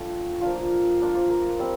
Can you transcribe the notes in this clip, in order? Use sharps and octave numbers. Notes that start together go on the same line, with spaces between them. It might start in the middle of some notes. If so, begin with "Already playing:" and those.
Already playing: A3 D4 F4 G5
F3 A#3 D4 F4 F5
A#3 D4 F4
C5
A#4
G3 C4